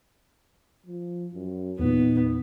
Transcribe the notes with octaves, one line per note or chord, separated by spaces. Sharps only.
F3
F#2
E2 A#2 B3 D#4